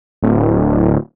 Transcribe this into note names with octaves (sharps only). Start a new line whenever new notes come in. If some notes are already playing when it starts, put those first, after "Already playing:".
D1